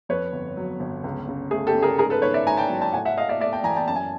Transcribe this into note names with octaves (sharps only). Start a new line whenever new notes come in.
F2 B4 C#5
G1
F#3
G1
C#2
C#3
A3 G#4
G4 A4
C#3
G#4 A#4
G#2 G#4 A#4
A4 B4
D#3 B4 C#5
D5 E5
G#2 G#5 A#5
G5 A5
F#3
G5 A5
A2 F#5 G#5
E5 F#5
A2 D#5 F5
D5 E5
A3 D5 E5
G5 A5
E3 G#5 A#5
G5 A5
F#2 A5
G#5